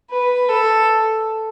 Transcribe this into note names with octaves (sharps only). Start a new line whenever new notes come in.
B4
A4